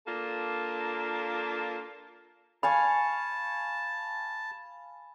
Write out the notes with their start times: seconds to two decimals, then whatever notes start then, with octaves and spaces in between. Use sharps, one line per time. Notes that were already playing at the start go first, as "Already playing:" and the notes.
0.06 A#3 D4 F4 A4
2.63 F5 G#5 A5 B5 C#6